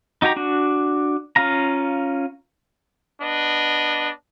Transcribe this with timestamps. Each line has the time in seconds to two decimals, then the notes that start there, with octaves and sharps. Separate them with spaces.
0.22 D#4 F#4 G4 A#5
0.36 D4 F#4
1.36 C#4 F4 F5 A#5
3.21 B3 D4 D#5